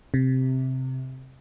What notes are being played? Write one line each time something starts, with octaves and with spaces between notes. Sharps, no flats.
C3